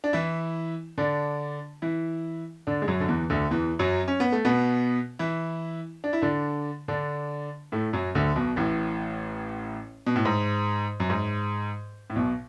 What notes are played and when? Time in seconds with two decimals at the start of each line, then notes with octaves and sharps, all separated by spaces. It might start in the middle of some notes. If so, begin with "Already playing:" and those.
0.04 D4
0.13 E3 E4
0.98 D3 D4
1.82 E3 E4
2.67 D3 D4
2.82 G#3
2.88 F#2 F#3
3.00 D3
3.08 E2 E3
3.30 D2 D3
3.51 E2 E3
3.79 F#2 F#3
4.08 C#4
4.20 B3
4.32 A3
4.45 B2 B3
5.19 E3 E4
6.04 D4
6.13 E4
6.22 D3 D4
6.88 D3 D4
7.72 A2 A3
7.93 F#2 F#3
8.15 D2 D3
8.35 B1 B2
8.56 A1 A2
10.07 B2
10.16 A2
10.25 G#2
11.00 F#2
11.10 G#2
12.10 A2
12.16 B1 B2